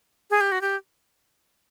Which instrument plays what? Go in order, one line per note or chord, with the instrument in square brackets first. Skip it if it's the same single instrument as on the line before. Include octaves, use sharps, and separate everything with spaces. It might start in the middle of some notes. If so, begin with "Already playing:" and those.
[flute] G#4
G4
F#4
G4